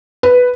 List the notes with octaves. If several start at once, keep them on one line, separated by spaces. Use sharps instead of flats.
B4